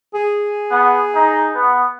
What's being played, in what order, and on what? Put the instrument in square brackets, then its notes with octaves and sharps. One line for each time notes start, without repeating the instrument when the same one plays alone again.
[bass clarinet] G#4
[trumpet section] B3
D#4
B3